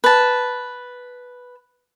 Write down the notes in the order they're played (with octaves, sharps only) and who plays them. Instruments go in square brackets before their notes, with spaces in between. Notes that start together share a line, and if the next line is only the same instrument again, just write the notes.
[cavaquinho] B4 A5